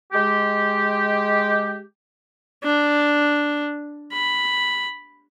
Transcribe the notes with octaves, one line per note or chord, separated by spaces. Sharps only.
G#3 G4
D4
B5